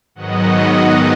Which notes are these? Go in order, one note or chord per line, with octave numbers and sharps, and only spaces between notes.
G#2 D#3 F#3 B3 D#5 F#5